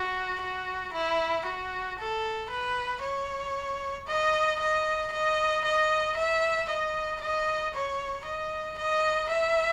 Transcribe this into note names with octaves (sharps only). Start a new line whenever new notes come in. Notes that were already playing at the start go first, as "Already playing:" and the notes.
Already playing: F#4
F#4
E4
F#4
A4
B4
C#5
D#5
D#5
D#5
D#5
E5
D#5
D#5
C#5
D#5
D#5
E5